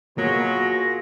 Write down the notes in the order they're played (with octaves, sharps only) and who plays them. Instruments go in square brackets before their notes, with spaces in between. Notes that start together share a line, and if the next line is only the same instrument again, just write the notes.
[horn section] B2 F#3 [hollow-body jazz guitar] A#3 [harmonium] F4 F#4 G#4 [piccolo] A#6